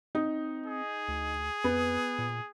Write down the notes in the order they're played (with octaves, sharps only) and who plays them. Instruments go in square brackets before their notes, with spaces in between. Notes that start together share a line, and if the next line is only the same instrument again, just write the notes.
[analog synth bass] C4 [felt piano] D#4
[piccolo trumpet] G#4
[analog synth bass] D2
[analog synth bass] F2 [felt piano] B3
[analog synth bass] A#2